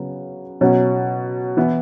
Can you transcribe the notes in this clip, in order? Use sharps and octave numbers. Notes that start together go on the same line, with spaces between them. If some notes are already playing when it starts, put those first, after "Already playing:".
Already playing: C#3 F#3 B3
B2 F#3 C#4
E3 B3 E4